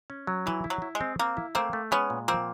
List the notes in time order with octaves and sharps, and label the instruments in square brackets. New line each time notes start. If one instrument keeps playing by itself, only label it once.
[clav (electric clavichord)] C#4
F#3
[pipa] E3 [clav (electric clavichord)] E4
[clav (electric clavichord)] E4
[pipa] F#3
[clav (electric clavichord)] E4
[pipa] G#3
[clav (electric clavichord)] C4
[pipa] A#3 [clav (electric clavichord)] C4
[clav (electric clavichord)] E4
[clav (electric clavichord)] A3 [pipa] A#3 C4
[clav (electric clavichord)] A3
[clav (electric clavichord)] G#3 [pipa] B3 C#4
[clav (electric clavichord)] A#2
[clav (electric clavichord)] F3 [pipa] A#3 C4